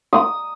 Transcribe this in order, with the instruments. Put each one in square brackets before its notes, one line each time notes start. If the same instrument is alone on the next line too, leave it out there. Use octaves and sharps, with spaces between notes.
[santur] D#6